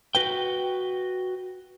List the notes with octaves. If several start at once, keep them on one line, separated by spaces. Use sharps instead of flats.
F#4 B4 G5